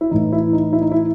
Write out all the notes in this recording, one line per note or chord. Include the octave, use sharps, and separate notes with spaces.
E4
A2 E3 D#4
E4
D#4
E4
D#4
E4